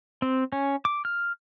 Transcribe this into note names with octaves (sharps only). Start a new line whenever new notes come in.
C4
C#4
D6
F6